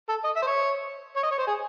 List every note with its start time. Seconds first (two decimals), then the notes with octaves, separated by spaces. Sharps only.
0.09 A4
0.24 D#5
0.36 E5
0.42 C5
0.47 C#5
1.16 C#5
1.23 D#5
1.31 C#5
1.38 C5
1.47 G#4